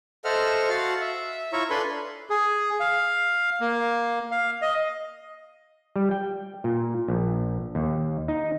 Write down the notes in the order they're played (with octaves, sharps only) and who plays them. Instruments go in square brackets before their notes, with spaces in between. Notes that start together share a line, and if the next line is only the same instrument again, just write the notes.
[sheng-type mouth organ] A4 C5 D#5 E5 F#5 F6
F#4 F5 F#5 A5
E5
E4 F4 C#5 E5 A#5 C#6
D4 A4 B4 G#5 B5 C6
[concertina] G#4
F5
A#3
F5
D#5
[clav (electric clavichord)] G3
G5
A#2
A#1
D#2
D#4